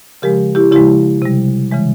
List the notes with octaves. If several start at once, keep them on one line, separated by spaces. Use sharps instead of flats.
C#3 F3 G#3 G4 A#4
E4 G4
C#3 F3 G#3 E4 G4
C3 G3
C#3 E3 G#3